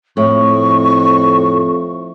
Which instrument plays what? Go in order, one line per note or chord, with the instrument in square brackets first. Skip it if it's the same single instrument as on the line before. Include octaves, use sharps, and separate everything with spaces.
[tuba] F2 [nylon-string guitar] A2 [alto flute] C#6